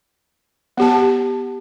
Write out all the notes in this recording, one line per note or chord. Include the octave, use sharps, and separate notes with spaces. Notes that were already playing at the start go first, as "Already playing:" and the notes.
B3 G4 A5